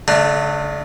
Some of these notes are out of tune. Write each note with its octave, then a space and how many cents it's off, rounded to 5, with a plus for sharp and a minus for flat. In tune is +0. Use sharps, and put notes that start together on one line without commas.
D3 -45 A3 +0 D4 +30